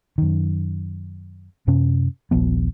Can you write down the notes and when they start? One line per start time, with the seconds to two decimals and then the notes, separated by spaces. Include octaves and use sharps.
0.18 F#2 D#3
1.67 F#2 C3 C#4
2.31 D#1 A#1 F3 B3